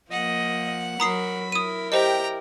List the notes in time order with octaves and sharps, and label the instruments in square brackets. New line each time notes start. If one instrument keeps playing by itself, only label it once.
[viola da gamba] F3 A#3 [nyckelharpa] D#5 [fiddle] F#5
[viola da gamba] F#3 A#4 [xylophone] A#5 D#6 C7 [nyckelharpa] B5
[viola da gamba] E4 A#4 [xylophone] D#6 D#7
[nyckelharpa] G4 [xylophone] C5 D#5 [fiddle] G5 A#5